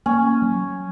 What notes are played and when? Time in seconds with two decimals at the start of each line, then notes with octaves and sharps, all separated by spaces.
0.06 A#3 C#4
0.42 F#3